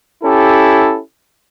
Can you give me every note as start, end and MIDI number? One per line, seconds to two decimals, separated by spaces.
0.24 0.99 61
0.24 0.99 64
0.24 0.99 67
0.24 0.99 69